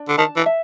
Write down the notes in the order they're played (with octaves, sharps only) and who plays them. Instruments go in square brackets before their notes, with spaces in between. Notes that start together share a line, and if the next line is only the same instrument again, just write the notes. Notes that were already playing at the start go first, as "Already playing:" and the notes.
Already playing: [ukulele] D4
[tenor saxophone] D3
[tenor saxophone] D#3 [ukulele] A5
[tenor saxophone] E3
[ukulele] E5